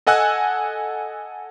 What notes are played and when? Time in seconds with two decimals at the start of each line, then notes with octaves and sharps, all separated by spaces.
0.07 A4 D#5 F#5 G#5 E6 F#6